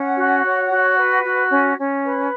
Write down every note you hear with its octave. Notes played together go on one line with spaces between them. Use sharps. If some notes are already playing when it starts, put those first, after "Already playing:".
Already playing: C#4 F#5
F#4
C#5
F#4
B4
F#4
C#4
C#4
B4